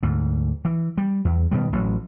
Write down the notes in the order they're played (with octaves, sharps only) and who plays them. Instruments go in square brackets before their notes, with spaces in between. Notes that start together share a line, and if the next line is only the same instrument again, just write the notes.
[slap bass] D2 G#2
E3
G3
E2
B2 D#3 G3
A1 F#3